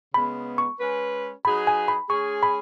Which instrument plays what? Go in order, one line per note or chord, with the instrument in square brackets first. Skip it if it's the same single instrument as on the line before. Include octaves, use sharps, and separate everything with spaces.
[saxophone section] C#3 G#3 B3 [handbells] B5
[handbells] C#6
[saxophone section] G#3 C#4 B4
[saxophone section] F#3 D#4 G#4 B4 [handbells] B5
[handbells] G#5
B5
[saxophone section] G#3 C#4 G#4 [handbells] C#6
[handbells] B5